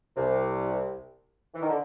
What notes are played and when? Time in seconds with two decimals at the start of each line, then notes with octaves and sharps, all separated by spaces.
0.17 C2 C3
1.54 E3
1.62 D#3
1.68 D3